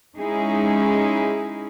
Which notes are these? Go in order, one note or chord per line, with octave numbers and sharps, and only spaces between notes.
G#3 C#4 D#4 E4 G#4